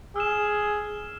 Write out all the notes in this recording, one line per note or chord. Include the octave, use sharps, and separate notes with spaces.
G#4 E6 F6 E7